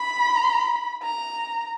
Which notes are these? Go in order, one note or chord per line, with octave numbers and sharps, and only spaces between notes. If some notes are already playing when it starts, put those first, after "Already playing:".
Already playing: B5
A#5